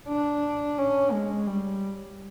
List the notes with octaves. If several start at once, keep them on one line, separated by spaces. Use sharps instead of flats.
D4
C#4
G#3
G3